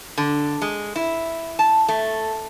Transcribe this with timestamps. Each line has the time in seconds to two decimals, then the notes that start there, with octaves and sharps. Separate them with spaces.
0.18 D3
0.62 G#3
0.96 E4
1.59 A5
1.88 A3